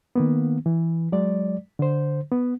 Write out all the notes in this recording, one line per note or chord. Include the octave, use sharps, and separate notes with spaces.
D#3 A#3 B3
E3
F#3 G#3 D5
D3 C5
B3